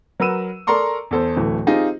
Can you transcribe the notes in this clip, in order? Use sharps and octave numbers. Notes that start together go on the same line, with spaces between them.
F#3 A#4 B4 E6 D#7 E7
A4 A#4 D5 A#5 C6 C#6
E2 A4 C5
D1 E3 A3
C4 D#4 F4 G4 G#4